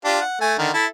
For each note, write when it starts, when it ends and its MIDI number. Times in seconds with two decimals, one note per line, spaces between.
0.05 0.21 62
0.05 0.21 65
0.05 0.21 67
0.21 0.37 78
0.41 0.54 57
0.41 0.54 80
0.59 0.71 50
0.59 0.71 51
0.74 0.86 64
0.74 0.86 69